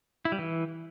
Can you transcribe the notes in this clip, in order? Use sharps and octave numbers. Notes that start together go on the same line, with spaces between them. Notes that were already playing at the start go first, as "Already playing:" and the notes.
E4
G3
E3